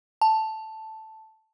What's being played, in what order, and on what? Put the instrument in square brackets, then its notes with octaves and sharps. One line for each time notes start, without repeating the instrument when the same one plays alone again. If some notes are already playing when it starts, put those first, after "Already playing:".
[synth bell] A5